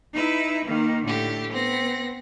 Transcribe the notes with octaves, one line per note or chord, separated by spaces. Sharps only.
D#4 E4 B4 E5
D#3 A#3
A2 D3 G4
B3 C4 A#6